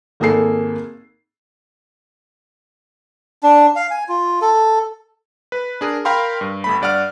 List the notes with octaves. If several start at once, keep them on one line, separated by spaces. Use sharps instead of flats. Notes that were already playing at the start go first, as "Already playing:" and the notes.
G#1 A#3 G#4 A4 C7
D4
F5
G#5
F4
A4
B4
D4 G#4 A#4
A#4 F5 G5 B5 C6
G2
G1 A3 B5
G2 D5 F#5 F6